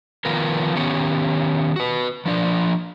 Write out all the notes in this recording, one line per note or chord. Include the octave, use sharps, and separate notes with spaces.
D#3 F3 B3 F4 A#4
D#3 B3 C#4 G4 C#5
F#4 B4
F3 D4 D5